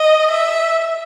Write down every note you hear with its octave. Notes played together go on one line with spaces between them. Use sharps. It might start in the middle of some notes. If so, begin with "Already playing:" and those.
Already playing: D#5
E5